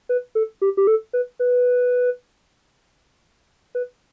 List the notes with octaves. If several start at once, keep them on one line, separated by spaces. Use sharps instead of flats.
B4
A4
G4
G4
A4
B4
B4
B4